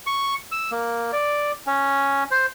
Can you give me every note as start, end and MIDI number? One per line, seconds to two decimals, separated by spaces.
0.07 0.34 85
0.52 0.71 88
0.71 1.11 58
1.13 1.51 74
1.67 2.24 61
2.31 2.46 72